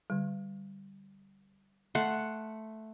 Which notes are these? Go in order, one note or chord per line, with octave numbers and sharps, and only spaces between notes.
D3 G3
A3 F#5 C6